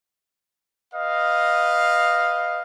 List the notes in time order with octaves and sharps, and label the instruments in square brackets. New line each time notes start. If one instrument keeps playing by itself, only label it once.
[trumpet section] B4 D#5 F5